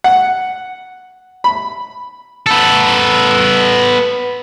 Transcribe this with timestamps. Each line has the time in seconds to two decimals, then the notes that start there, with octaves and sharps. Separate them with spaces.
0.04 F#5
1.44 B5
2.46 B3 A4